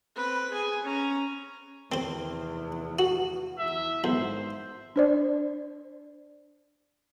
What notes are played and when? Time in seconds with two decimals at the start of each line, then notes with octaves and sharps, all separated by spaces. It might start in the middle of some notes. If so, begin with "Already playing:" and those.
0.16 C4 B4
0.51 G#4 G#5
0.83 C#4 A#5
1.92 F1 E2 C4 C5
2.99 F#4
3.59 E2 E4 E5
4.04 G#1 E2 C5
4.96 D4 C5 D5